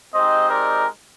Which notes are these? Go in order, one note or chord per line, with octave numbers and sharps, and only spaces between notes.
G#3 C4 D#4 G4 C5 D#5
A#4 D5